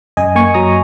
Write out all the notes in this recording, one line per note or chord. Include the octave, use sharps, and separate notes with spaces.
F#2 D#5 G#5
A#3 G#5 C#6
F#3 A#5 D#6